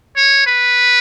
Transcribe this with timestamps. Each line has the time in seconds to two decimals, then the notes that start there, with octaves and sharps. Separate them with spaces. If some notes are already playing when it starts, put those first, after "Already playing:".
0.16 C#5
0.47 B4